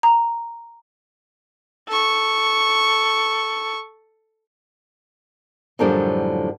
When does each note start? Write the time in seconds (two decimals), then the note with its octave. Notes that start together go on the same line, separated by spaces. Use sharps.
0.03 A#5
1.88 A4 C#6
5.79 F#2 A2 D3 F3 G3 D4